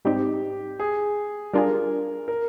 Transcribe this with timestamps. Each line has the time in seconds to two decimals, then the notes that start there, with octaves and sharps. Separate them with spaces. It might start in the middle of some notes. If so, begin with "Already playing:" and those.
0.05 G#2 G3 C4 D#4 G4
0.79 G#4
1.54 G3 D4 F4 G#4 A#4
2.28 A#4